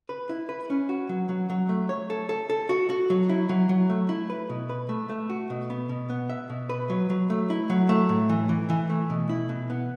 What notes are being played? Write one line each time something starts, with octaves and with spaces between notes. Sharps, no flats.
B4
E4
B4
C#4
F#4
F#3
F#3
F#3
A3
C#5
A4
A4
A4
F#4
F#4
F#3
E4
F#3
F#3
A3
E4
B4
B2
B4
A3
A3
F#4
B2
B3
B2
B3
E5
B2
B4
F#3
F#3
A3
E4
F#3
A3
A2
E3
E3
E3
A3
B2
E4
B2
B3